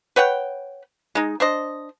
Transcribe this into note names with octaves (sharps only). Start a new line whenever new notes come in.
B4 C#5 F#5 G5
G#3 D#4
D4 C5 D#5